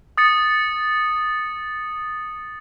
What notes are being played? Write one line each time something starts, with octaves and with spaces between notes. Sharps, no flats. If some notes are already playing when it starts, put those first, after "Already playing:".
D#6 A6 C#7